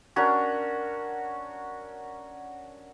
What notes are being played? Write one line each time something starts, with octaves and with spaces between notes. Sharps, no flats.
C#4 D4 F#4 A#4